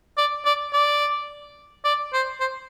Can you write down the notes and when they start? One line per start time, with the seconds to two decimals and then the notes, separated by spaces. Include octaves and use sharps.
0.17 D5
0.45 D5
0.73 D5
1.85 D5
2.13 C5
2.40 C5